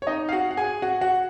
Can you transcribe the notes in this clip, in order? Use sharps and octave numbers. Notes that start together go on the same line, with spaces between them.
C#5
D#4 D#5
F5
F#4 F#5
F#5
G#4 G#5
F#4 F#5
F#4 F#5